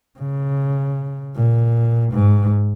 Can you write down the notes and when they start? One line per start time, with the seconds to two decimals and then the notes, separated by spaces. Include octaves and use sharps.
0.19 C#3
1.35 A#2
2.13 G#2